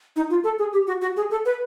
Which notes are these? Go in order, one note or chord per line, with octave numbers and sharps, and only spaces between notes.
D#4
F4
A4
G#4
G4
F#4
F#4
G#4
A4
B4